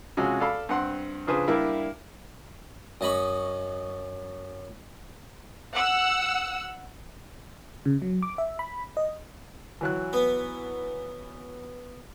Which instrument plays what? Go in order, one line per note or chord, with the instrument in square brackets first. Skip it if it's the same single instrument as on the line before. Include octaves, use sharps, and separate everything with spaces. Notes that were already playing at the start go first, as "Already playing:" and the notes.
[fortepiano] C3 F3 G#3 C#4 F#4
A4 D5 F5 B5
G2 C4 F#5 C6
C#3 F3 D4 G#4 B4 C5
G3 A#3 D4 E4 E5
[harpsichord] F#2 D#5 B5 C#6
[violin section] F#5 E6 F#6
[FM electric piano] C#3
F#3
D6
E5
B5
D#5
[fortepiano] E3 F#3 F#6
[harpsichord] B3